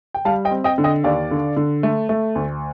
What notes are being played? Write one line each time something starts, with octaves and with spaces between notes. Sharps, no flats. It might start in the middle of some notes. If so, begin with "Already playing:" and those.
G5
G3 F5 A5
D#5 G5
C4
D#5 G5
D3
D#5 G5
D#2 D5 F5
D3
D3
A3
A3
D2